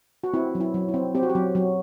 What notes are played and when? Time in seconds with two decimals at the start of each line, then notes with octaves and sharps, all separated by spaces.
0.24 F#4
0.34 C4 E4
0.55 F#3
0.60 E4
0.74 F#3
0.88 E4
0.94 C4
1.15 C4 G4
1.23 F#4
1.29 G4
1.35 F#3
1.55 F#3